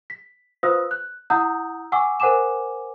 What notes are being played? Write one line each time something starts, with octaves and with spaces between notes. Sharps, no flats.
B6
F4 B4 C5 F5 D#6 E6
F#6
E4 F#5 A#5 D#6 E6 G6
F#5 G#5 C#6 D6 E6
A#4 C5 F#5 G#5 D6 E7